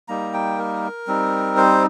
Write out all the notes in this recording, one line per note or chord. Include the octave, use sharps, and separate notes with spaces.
G3 A#3 D#4 A#5
G5
A#4
G3 C4 D#4
C5